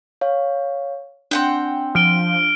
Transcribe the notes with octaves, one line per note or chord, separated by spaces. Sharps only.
C#5 F5
C4 D4 F#5 G5
F3 F6 D7 G7